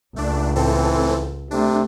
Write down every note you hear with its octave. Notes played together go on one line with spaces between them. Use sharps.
C#2 A3 D4
A2 E3 C4 A4
C3 A3 D4